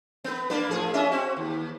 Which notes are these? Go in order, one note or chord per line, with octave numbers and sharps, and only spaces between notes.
B3 B4
A#3 D4 B4
A2 F3 G#4
C#4 D#5 E5
C4 F#4
D#2